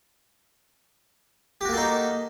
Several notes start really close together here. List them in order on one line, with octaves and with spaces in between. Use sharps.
G4 F#4 A#3 A4 D#4